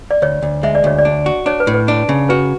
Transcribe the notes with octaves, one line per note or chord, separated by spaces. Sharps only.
D5
D2 C#5
D2
G#3 E5
D5
D2 C#5
D5
D4
F#4
D4 C#5
B4
A2
B4
D4
C#3
F#4 B4